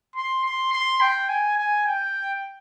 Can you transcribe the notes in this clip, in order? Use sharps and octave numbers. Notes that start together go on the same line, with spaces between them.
C6
C6
C6
G5
G#5
G#5
G5